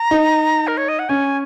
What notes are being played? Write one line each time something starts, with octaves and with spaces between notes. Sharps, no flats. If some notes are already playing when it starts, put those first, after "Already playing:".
Already playing: A#5
D#4
A#4
C#5
D#5
F#5
C#4 G#5